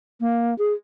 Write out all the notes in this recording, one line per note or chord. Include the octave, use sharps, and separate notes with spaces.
A#3
G#4